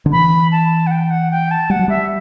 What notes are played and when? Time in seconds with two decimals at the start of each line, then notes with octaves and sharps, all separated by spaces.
0.06 D3
0.12 E3 B5
0.52 A5
0.87 F#5
0.91 G5
1.11 F#5
1.31 G5
1.51 A5
1.70 G3 F#5
1.79 F#3
1.88 G3 E5